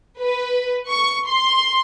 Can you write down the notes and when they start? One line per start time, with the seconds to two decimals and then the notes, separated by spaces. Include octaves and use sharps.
0.20 B4
0.89 C#6
1.27 C6